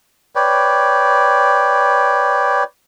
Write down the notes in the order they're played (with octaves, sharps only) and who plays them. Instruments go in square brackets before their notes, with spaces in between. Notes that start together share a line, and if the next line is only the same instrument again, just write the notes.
[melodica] B4 C#5 D5 G5